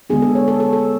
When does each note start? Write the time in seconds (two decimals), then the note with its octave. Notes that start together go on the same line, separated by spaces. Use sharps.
0.10 D3 G#3 B3 D4 G#4
0.22 A4
0.35 C#5
0.48 A4
0.60 A4
0.73 A4